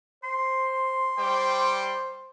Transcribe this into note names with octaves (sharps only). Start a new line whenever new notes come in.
C5 C6
G3 C5 G5 D6